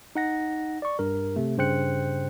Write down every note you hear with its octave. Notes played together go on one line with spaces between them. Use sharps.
D#4 F#5 A#6
D5 C#6
G2 A#4
C3 A3
G2 C#3 C5 G5 F#6 C#7